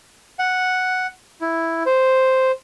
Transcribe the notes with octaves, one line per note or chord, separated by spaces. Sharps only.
F#5
E4
C5